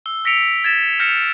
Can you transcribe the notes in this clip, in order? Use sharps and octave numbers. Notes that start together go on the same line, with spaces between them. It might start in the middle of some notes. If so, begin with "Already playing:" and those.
E6 G7
E6 A#6 B6 C#7 D7 F7
G#6 A6 B6 E7
F6 G6 A#6 C#7 E7 F7